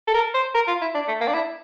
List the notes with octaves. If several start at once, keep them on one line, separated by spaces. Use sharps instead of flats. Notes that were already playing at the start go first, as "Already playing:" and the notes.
A4
A#4
C5
A#4
F4
E4
D4
A3
A#3
D4
E4